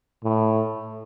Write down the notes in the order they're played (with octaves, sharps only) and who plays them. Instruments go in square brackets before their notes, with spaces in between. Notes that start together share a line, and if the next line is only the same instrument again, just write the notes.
[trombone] A2